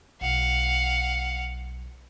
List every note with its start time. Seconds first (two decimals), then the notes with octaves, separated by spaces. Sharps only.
0.21 B1 F5 F#5